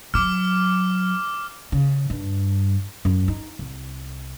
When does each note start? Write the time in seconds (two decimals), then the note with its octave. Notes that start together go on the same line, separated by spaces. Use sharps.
0.14 F#3 D6 F6
1.72 C#3
2.10 G2
3.05 F#2
3.28 D#4
3.59 C2